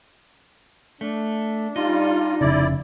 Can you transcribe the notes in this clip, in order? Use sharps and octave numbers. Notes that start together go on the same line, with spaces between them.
A3 D4
G3 D#4 F4
F1 C#3 E4 D5